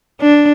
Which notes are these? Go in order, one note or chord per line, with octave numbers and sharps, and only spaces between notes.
D4